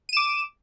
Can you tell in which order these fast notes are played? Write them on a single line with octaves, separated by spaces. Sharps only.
D#7 E7 D6